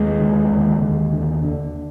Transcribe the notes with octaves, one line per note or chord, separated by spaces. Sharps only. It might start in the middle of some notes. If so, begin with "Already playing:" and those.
Already playing: D#2 G#3
D3
D#2
D#2
D3
D3